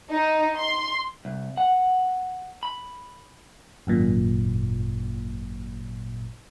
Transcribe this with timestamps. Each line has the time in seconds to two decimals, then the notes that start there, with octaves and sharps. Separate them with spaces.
0.12 D#4
0.57 C6
1.25 C2
1.57 F#5
2.63 B5
3.87 G#1 F#2 A#2